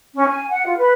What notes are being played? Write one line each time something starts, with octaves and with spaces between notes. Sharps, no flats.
C#4
G#5
F#5
F4
B4